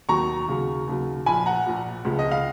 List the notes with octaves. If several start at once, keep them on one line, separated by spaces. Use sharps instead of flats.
D#2 D#3 F#3 A#5 C#6
D#2 C#3 F#3
D#2 C#3 F#3
A#1 A#2 F3 G#5 B5
F#5 A#5
A#1 A#2 F3
C#2 C#3 F3
D#5
F5